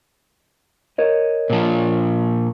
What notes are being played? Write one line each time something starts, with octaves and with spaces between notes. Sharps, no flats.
A#4 C#5 D#5
A#2 F3